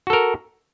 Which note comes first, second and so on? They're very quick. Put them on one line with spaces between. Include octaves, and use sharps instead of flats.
F#4 A4 A#4